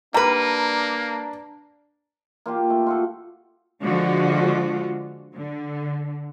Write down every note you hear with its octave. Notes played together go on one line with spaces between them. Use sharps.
G3 A#3 D4 B4 A#5
A#3 F4 G4 A5
A3
F4 F#4 A4
D3 F3 G#3 F4 F#4
D3